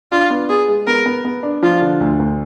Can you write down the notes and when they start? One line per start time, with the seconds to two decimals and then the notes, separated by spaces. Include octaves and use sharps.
0.12 D4 F4
0.30 B3
0.49 B3 G#4
0.68 G#3
0.87 B3 A#4
1.06 B3
1.25 B3
1.43 D4
1.63 F3 F4
1.82 D3
2.01 D2
2.19 D2